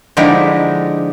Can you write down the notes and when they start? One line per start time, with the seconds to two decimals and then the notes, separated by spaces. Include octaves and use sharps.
0.17 D3 F3 G#3 D#4 E4 G4